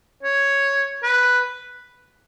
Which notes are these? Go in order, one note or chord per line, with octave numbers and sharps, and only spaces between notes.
C#5
B4